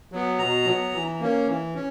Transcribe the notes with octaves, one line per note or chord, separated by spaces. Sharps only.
F#3 B3
B2 A#5
F#3 B3
E3
A#3 C#4
E3
C#4